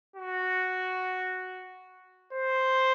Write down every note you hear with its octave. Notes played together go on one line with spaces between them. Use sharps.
F#4
C5